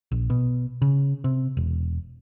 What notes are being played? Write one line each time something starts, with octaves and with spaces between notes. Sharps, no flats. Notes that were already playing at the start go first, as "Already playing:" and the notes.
A#1
B2
C#3
C3
E1